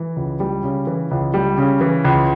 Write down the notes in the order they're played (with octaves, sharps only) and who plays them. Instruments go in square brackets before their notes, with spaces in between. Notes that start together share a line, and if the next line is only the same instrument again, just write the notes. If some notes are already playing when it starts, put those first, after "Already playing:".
Already playing: [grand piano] E3
C#2
G3
C#3
E3
C#2
G3
C#3
E3
C#2